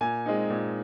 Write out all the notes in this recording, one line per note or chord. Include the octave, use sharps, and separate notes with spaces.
A#2 G#5
G#3 C4 D#4
A#2